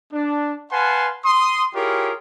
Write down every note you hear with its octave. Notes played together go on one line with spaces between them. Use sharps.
D4
B4 F5 F#5 G#5 A5 C6
C6 D#6
E4 F4 G4 G#4 A#4 C#5